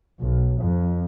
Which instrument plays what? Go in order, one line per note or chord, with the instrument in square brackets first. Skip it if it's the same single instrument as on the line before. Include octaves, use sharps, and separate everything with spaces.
[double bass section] B1
F2